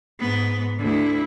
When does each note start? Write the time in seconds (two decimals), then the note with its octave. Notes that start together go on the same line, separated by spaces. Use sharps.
0.20 G#2 B3
0.78 D2 E4